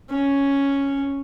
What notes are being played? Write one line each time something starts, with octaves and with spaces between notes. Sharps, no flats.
C#4